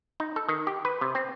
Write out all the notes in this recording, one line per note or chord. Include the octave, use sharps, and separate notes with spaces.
D#4
A4
D#3
G4
B4
C3
C4